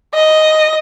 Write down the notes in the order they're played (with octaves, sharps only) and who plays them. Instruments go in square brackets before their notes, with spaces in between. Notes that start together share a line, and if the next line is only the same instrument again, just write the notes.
[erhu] D#5